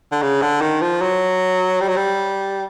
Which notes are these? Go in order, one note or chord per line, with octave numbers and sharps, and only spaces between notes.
D3
C#3
D3
D#3
F3
F#3
G3
F#3
G3